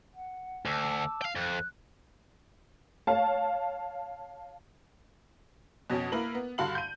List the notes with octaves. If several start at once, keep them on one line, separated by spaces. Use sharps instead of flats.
F#5
D2 A5 D6 E6
F5 G5
F2 F#6
C#5 F5 A5
F2 B2 C#4
A#3 E4 A#4 B4 F#7
B3
G2 D3 F#4 F5 B5 F#7
G6 D#7